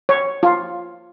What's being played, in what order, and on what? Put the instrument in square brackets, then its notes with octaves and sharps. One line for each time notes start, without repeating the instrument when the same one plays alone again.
[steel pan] C#5
F4